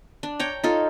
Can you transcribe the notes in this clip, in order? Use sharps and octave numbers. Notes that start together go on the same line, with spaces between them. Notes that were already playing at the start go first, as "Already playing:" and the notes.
D4
C#5 G5 A#5
D#4 F4 A4